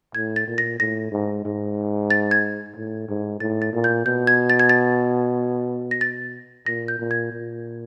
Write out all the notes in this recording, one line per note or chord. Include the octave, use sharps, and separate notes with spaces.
A2 G#6
A6
A#2
A#6
A2 A#6
G#2
G#2
A6
G#6
A2
G#2
A2 A6
A6
A#2
G6
B2 G6
G#6
A6
G#6
A6
A#6
A6
A#2 A#6
G6
A#2
G#6
A#2